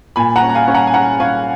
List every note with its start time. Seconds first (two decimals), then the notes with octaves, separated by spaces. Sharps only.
0.16 A#2 G#5 B5
0.36 F#5 A#5
0.43 C#4
0.49 A#5
0.55 F5 G#5
0.68 C#4
0.74 F#5 A#5
0.87 G#5
0.94 C#4 F#5 A#5
1.20 C#4 F5 G#5